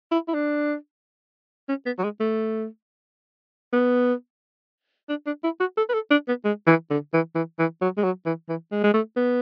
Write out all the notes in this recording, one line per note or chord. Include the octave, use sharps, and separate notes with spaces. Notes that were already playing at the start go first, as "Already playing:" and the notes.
E4
E4
D4
C#4
B3
F#3
G#3
A3
B3
D4
D4
E4
F#4
A4
B4
A4
D4
B3
G#3
E3
D3
E3
E3
E3
F#3
G#3
F#3
E3
E3
G#3
G#3
A3
B3